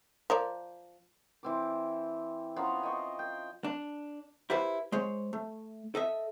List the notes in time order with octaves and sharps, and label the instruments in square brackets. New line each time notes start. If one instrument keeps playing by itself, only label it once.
[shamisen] F3 A#4 D5
[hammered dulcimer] E3 C4 D6
F3 B3 C#4 A#5
C5 D#5 G5 C#6
G5
[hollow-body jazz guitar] D4
E4 G4 B4 C5
G#3 C5 C#5
A3
A4 D#5 E5